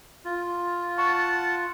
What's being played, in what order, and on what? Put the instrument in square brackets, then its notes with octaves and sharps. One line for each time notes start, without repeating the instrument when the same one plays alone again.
[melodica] F4
[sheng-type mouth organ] F#5 A5 [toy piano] C#6